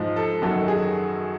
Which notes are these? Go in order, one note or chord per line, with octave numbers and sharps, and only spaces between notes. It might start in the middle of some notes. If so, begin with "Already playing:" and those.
Already playing: G#2 F3
A4
F#2 D#3 F#3 A4
G#4